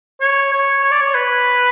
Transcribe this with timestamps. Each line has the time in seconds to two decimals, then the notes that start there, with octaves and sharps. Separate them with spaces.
0.21 C#5
0.52 C#5
0.83 C#5
0.91 D5
1.00 C#5
1.15 B4